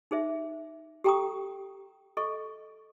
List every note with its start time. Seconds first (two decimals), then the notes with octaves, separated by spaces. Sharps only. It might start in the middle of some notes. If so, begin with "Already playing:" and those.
0.11 D#4 G#4 C5 E5
1.04 G4 A4 G5 A#5 C#6 D#6
2.17 A4 D#5 C#6